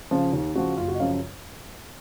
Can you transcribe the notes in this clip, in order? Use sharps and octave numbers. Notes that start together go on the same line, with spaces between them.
C#3 F3
D#2
C#3 F3 F#4
F#1 F4
F#4
D#5
F#2 C#3 F3 F5